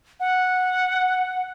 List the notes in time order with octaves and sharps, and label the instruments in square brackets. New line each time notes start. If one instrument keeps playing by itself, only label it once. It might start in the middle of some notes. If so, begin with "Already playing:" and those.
[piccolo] F#5